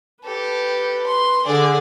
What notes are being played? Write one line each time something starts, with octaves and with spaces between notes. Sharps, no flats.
G4 A4 B4
C6
D3 G#4 D5